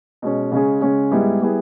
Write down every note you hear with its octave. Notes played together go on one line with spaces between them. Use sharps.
B2 G#3 C#4
C#3 G#3 C#4 G#4
C#3 G#3 C#4 G#4
G#2 G3 B3 E4 G#4
G3 B3 E4 G#4